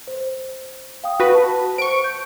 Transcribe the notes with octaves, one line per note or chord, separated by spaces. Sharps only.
C5
F5 G5 D#6
F#4 B4
A5
C5 C#6 D7
G6